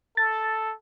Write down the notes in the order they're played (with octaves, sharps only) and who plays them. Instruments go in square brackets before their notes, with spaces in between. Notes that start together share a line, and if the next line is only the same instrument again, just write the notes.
[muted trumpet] A4 [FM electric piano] A6